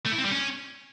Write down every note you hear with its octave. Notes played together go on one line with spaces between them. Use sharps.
A3
E4
C4
G3
C#4